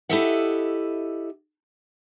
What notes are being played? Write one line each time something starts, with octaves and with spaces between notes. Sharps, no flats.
E4 G4 A4 D#5 E5 F#5